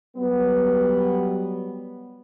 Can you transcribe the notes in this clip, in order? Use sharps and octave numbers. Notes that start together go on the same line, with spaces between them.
F#3 G3 B3